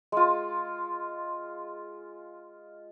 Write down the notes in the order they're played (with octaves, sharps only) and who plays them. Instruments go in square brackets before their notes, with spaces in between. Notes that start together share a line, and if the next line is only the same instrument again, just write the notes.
[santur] G#3 F4